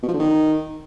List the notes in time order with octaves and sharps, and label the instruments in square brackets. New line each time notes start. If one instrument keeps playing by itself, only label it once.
[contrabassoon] B2
F3
D3
D#3